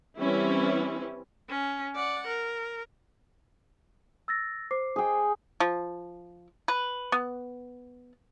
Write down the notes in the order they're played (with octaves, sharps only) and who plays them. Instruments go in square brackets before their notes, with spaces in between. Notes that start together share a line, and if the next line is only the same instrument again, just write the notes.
[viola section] E3 G3 C4 C#4 E4
[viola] C#4
D5 F#5
A#4
[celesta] E6 A6 A#6
C5 D6 C7
[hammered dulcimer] G#4 G5
[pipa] F3
B4
B3